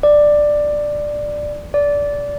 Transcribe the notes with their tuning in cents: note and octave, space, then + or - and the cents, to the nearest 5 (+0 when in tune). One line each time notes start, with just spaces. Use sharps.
D5 +10
D5 -20